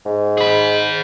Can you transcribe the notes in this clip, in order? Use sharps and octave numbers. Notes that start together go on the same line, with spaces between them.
G#2
G#4 B5